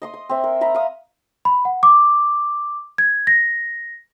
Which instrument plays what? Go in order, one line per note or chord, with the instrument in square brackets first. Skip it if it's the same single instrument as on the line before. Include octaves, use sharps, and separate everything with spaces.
[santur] D#5 C6 D#6
C6
C4 E5
A#4
D#5 E5 A#5 B5
F5 D#6
[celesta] B5
F#5
D6
G#6
A#6